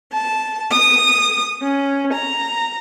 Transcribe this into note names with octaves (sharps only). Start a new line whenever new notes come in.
A5
D#6
C#4
A#5